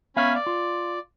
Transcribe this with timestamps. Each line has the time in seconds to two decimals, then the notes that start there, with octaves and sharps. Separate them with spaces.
0.17 B3 C#4 E5 F5 G#5 B5
0.35 D5
0.47 F4